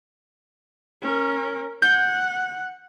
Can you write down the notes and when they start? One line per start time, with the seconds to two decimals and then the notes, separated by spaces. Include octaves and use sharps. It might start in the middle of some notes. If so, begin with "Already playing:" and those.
1.02 C#4 A#4
1.82 F#5 G6